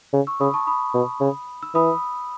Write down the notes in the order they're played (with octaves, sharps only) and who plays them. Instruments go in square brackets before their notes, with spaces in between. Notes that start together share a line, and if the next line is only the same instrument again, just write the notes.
[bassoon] C#3
[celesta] C#6 E6
[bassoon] C#3 [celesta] B5 D#6
[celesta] A5 C#6
B5 D#6
[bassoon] B2
C#3
[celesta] E6
[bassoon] E3 [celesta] B5 D#6